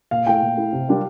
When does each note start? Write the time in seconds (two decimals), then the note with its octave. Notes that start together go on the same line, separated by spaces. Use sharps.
0.11 A#2 F5
0.26 A3 E4 G5
0.42 A#2
0.57 A3 E4
0.73 C3
0.89 G3 D4 F4 A#4